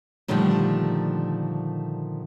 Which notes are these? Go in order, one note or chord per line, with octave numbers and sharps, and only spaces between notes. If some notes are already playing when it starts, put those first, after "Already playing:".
A#2 D3 D#3 F3 G3 A3